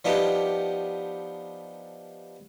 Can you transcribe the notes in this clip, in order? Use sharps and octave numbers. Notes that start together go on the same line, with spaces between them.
F3 B3 D4 D#4 G4